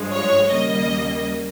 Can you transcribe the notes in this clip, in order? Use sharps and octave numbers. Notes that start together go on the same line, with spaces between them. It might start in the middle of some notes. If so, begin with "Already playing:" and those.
Already playing: G2 F3 G#3
C#5
D#2 C#3 G3 A#3 D#5